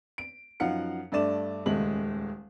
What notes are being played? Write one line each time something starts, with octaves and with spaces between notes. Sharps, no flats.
D7
F#2 F3 D#4 F5 F#5 C#7
G2 A3 D4 D5 E7
D#1 C#2 G#3 A3 F#7